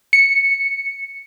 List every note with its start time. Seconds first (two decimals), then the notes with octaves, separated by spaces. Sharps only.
0.13 C#7